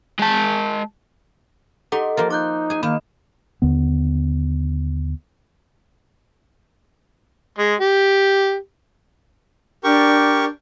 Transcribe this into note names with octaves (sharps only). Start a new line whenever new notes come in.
G#3 A5
D#4 G4 A4 F#5
F3 A#3 F4 A#4
D#4 D6 F#6 G6
G#4 G#5
D#3 A#3 B5
D#2 D3 B3
G#3
G4
D4 G4 A#4 C#6